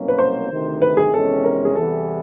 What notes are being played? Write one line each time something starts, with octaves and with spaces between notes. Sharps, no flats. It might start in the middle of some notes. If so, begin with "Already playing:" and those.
Already playing: C2 B2 F#3 A#3 C#4
B4
C5
D2 C3 D#3
B4
G#4
E2 C3 D#3 G#3 C#4 A4
A#4
G#4
E2 C3 E3 G3 B3 A4